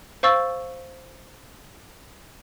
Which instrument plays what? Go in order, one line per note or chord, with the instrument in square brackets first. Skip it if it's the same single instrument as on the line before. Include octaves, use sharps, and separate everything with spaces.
[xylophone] C5 F5 C#6 E6 A6